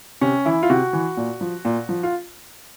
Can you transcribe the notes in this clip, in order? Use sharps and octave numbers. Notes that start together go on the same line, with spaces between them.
C3 C#4
E3 E4
F4
C3 F#4
E3
A#2
F3
A#2
F3
F4